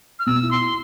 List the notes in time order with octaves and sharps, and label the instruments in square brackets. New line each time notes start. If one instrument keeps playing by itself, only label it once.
[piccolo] F6
[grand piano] B2 [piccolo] E6
[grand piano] E4
[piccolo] C6